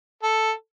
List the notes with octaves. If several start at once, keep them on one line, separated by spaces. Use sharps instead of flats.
A4